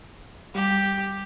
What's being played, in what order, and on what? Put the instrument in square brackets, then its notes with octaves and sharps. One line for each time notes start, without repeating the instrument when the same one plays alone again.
[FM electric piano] G3 [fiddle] G4